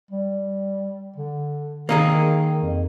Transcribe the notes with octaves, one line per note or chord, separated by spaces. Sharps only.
G3
D3
D#3 A#3 D#4 G#4
F2